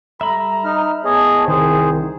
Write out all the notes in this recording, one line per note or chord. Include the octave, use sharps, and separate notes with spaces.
G3 A4 E5 A#5 B5
D#4 F6
A2 B3 G#4 C#5 D#5 A5
C2 D#3 G#4 C5